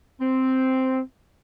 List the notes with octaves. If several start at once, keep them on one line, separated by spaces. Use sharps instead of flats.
C4